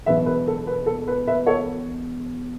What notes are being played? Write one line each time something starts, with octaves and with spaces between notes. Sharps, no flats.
E1 E2 B2 F#3 B3 B4 E5
B4
A4
B4
A4
B4
B4 E5
A4 C#5